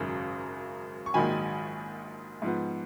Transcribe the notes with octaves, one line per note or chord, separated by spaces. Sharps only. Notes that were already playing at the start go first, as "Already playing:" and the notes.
Already playing: G#1 F#2 C#3
C#6
A#1 G#2 D#3 F#3 G#5 B5
G#2 F3 B3